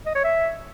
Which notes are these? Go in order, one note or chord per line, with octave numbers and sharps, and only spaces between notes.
D#5
C#5
E5